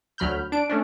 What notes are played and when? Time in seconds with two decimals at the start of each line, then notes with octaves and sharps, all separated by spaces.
0.18 D2 F#3 B5 F6 G6
0.52 D4 D7
0.70 A3 C#4 D4